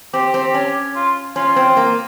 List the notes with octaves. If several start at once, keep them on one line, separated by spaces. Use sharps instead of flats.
C4 G4
C4
C#4
F4
C#4 F4
C4
A#3